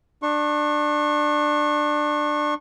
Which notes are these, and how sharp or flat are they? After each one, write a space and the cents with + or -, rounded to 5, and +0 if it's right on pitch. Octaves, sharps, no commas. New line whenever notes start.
D4 +20 C#6 -30